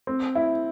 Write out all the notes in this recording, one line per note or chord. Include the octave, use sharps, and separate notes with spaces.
C4
E4